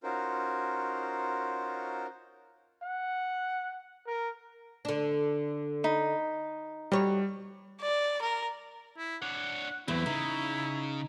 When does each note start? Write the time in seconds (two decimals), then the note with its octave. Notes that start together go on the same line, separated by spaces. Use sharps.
0.03 C#4 D#4 F4 F#4 A#4 C5
2.83 F#5
4.07 A#4
4.85 D3 D4
5.84 D#4 B5
6.92 F#3 G3 C#5
7.81 D5
8.22 A#4
8.98 E4
9.22 D4 C#5 F#5
9.88 E2 F#3 C4 E4
10.06 C#3 D#4